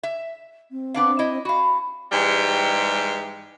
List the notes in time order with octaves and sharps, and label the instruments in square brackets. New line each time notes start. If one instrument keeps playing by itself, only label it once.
[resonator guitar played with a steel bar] E5
[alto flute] C4
[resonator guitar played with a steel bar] B3 D4 F5
E4 D#5
[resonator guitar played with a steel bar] F#4 F5 [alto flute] B5
[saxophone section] G#2 E3 G3 G#3 G4